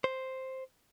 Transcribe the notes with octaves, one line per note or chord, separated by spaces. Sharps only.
C5